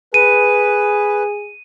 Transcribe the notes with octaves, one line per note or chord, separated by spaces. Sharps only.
G#4 B4 D#7